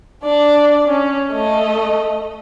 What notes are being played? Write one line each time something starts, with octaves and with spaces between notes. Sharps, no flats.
D4 D5
C#4
A3 D#5